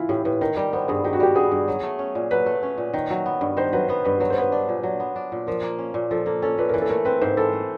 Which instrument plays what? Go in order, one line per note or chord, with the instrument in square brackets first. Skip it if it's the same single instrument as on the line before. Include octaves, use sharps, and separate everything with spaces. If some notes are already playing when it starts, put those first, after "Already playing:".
Already playing: [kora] E3 [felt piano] E4 F4
[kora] A2 [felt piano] G4
[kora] A2 [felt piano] B4
[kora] D#3 [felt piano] A#4
[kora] G3 [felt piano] A#4
[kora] B3 [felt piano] C5
[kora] G2 [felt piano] G#4
[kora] D#3 [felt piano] G4
[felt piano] F#4
[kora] G3 [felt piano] G4
[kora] B3 [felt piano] G#4
[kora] G2
F#3
A3
C#4
A#2
[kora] F#3 [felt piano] B4
[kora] A3
C#4
A#2
D#3
F#3
B3
G2
[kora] D#3 [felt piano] C5
[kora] F#3 [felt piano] B4
[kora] B3 [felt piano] B4
[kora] G2 [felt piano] B4
[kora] F#3 [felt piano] B4
[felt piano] C5
[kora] B3 [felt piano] B4
[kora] D4
A#2
F#3
B3
D4
A#2
[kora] F3 [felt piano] A#4
[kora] A#3
C#4
A#2
[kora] F3 [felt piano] A4
[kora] A#3 [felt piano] A4
[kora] C#4 [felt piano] A4
[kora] A#2 [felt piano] B4
[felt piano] A#4
[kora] E3 [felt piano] B4
[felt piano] A4
[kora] A3 [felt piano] A#4
[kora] C4 [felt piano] B4
[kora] G#2 [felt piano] C5
[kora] E3 [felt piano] A4
[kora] A3